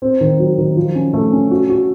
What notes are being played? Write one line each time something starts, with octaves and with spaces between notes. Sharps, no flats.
C4
D#3
F#3
D#3
F3
C#4
A3
C#4
F#4
F#4